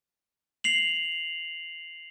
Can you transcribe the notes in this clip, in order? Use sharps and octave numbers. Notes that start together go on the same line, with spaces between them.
C7 F7 F#7